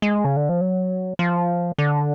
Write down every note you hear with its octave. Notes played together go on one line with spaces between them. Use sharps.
G#3
C#3
D3
F3
F#3
F3
D3